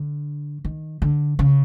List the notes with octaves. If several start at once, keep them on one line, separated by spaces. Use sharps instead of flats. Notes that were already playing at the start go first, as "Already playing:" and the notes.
Already playing: D3
D#3
D3
C#3